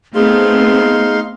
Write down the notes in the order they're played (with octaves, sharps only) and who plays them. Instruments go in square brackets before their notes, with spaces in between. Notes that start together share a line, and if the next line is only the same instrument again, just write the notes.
[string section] A3 B3 C4 [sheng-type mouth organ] D#4 F5 C6 [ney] G#4